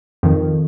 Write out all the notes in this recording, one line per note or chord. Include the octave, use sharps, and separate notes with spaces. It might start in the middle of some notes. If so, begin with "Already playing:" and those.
F2 D#3